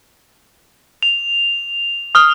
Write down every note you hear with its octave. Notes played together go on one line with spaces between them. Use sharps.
F7
D#6 F6